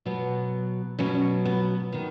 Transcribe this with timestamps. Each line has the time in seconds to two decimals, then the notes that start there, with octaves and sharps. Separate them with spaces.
0.05 B2 F#3 B3
0.99 B2 F#3 C#4
1.45 B3
1.92 D#3 B3